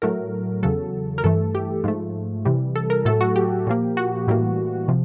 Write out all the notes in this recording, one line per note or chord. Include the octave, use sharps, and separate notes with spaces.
A2 F#3 A3 A#4
E2 C#3 F#3 A4
A#4
G2 E3 A3 A4
G4
G#2 F3 A3
C3 E3 G3
A4
A#4
A2 F#3 A3 A4
F#4
G4
A#2 F3 A#3
F#4
A2 E3 G3 A#3
C3 F3